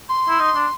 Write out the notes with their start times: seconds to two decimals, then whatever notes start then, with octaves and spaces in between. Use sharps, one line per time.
0.08 C6
0.29 E4
0.39 D#4
0.55 D4